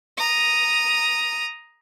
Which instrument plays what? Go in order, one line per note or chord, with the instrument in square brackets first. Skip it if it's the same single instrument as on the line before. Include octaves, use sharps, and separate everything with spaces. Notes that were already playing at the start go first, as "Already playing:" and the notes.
[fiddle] A#5 D#6